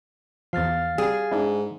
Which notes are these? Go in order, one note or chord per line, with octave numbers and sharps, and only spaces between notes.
E2 F3 F5 F6 A6
G3 G#4
G#2 D4 E4